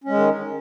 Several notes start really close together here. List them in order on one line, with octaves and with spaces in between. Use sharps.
C#4 G#3 D#3